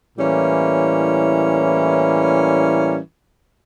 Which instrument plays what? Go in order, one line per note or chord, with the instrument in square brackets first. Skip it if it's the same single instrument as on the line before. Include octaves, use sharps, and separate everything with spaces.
[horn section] A2 E3 G3 A#3 C#4